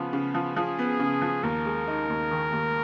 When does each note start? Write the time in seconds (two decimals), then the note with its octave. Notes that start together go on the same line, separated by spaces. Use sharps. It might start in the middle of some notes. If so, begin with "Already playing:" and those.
Already playing: C#3 F3 B3
0.13 C#3
0.34 F3
0.56 F3 G#4
0.79 B3
1.00 C#3
1.22 F3
1.43 D#2 A#4
1.66 G#3
1.87 D#4
2.09 D#2
2.31 D#3
2.52 D#2